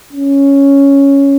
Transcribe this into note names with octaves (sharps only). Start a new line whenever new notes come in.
C#4